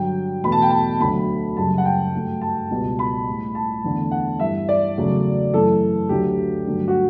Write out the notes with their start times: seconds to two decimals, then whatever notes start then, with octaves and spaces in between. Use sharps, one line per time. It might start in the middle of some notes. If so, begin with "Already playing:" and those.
Already playing: G2 D3 F#3 G5
0.43 E2 B2 A3 B5
0.52 A5
0.62 G5
0.70 A5
1.00 D2 D3 F#3 A3 B5
1.57 F#2 C#3 G3 A5
1.78 F#5
1.85 G5
2.13 G2 F#3 A3
2.41 A5
2.70 C#2 B2 G3
2.99 B5
3.26 A2 G3
3.55 A5
3.84 E2 D3 A3
4.11 F#5
4.40 G2 E3 G3 E5
4.69 D5
4.97 E2 C#3 F#3 A3
5.53 F#2 E3 A3 A4
6.09 D2 D3 F#3 A3 G4
6.67 G2 D3 F#3 A3
6.88 F#4